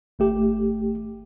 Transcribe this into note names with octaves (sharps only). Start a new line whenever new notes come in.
G1 A3 G4